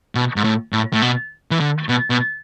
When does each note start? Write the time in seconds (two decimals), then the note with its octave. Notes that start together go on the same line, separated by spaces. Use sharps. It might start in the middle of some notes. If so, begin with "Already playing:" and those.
0.15 B2
0.36 G#2
0.44 A2
0.73 A2
0.93 A2
1.02 B2
1.51 E3
1.60 D3
1.89 B2
2.10 B2